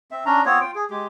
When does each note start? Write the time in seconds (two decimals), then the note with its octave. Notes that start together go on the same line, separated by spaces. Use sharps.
0.11 C4 E5
0.25 C#4 D4 A#5
0.45 B3 C4 F4 C#5
0.61 F4 G5
0.75 G#4
0.90 G#3 G4